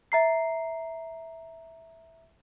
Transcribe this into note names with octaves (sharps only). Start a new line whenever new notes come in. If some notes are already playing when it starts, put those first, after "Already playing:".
E5 A#5 C7